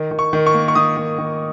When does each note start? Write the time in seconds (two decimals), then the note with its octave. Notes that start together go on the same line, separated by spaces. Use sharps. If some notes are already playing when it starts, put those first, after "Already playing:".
Already playing: D#3
0.11 D#3
0.19 C#6
0.33 D#3
0.46 C#6
0.54 A#3
0.68 C#6
0.75 D#3 D#6
0.97 D#3
1.18 D#3